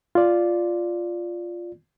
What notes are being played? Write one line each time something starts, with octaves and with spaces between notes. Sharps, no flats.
F4 D5